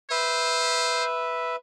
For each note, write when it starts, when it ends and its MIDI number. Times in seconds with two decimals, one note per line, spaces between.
0.11 1.56 71
0.11 1.04 72
0.11 1.56 76